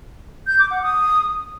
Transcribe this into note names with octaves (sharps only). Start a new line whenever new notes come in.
G6
D6
F#5
D#6